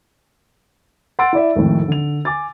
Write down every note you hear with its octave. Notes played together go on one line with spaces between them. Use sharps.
F#5 C6 E6 A6 D7
E4 D5 E5
G#1 F2 A2
D3 F7
G#5 D6 A6